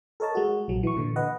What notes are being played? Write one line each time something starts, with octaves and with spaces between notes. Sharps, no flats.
A4 A#4 C#5 D#5 A5
G#3 F#4
A#1 F#3
E3 C#6
A#2 D3 E3
B4 D#5 F#5